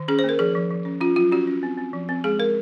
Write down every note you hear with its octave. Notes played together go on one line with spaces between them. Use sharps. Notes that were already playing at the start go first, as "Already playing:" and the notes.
Already playing: D#3
C#4 G#4
C5
A#3
A#4
F3 G#4
F3
F3
C#4
C#4 F4
F#3 F4
C#4 F#4
C#4
C4
C4
F3
C4
G#3 G#4
G#3 A#4